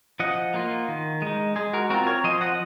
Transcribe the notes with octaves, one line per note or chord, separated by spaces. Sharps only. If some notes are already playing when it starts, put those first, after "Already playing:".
F3 D#5 F#5
A#3 F4
D#3
G#3 D#4
G#3 G#4
F#4 A#4
C4 F4 F#4 A#4
A#4 C#5
F3 C5 D#5
D#5 F#5